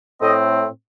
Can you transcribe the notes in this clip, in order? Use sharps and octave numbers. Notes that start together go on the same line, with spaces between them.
A2 A3 C4 D#5